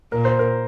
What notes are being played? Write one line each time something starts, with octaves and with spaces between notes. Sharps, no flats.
A#2 A#4
C5
A#4